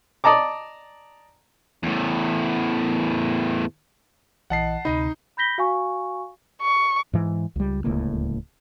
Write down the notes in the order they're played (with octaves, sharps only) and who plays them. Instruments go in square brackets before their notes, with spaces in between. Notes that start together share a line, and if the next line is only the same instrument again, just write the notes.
[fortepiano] D5 D#5 A5 A#5 D6
[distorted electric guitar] E2 A2
[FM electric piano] A#1 E3 D#5 [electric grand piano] F#5 A5 C7
[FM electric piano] D2 C3 B5 [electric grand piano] D#4 D#5
[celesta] B5 G6 A#6 B6 G7
F#4 F5 G#5 C#6
[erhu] C#6
[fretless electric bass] G#2 E3
C#2 G3
D1 C#2 A2 A#3